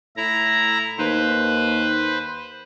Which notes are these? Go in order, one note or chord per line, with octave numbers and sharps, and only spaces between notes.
A2 E4 A#5
D#2 B4 C5